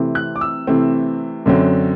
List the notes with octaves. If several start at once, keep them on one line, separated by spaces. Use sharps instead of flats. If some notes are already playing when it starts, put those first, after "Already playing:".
Already playing: C3 E3 A3 C4
F#6
D6
E6
C3 E3 A3 C4
F#2 D3 F#3 C4